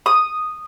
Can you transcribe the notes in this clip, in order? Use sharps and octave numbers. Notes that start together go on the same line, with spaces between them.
D#6